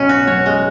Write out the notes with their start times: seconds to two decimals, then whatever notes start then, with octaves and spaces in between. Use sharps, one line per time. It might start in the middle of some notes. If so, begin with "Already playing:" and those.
Already playing: B1 B2 C#4
0.09 F#4
0.27 F#2 C#5
0.46 G#3